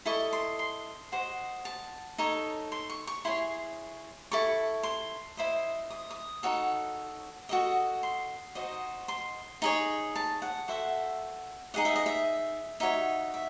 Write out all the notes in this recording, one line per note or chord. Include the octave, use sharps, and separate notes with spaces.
E4 A4 D#5 C#6
C6
C6
F#4 C5 D#5
A5
D#4 A4 C#5
C6
C#6
C#6
E4 G#4 C#5 C6
E4 A4 C#6
C6
E4 C5 D#5
D#6
D#6
D#4 F#4 A4 C#5
F#4 A4 D#5
C6
D#4 F#4 C5 D#5
C6
D#4 G#4 C#5
A5
F#5
F#4 A4 C5 E5
D#4 G#4 D#5 F#5
E5
D#5
E5
D#4 F#4 C#5 E5
E5